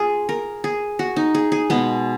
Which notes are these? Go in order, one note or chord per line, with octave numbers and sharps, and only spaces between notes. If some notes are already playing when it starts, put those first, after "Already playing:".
Already playing: F4 G#4
A#4
G#4
F#4
D#4
G#4
G#4
B2 G#3 B3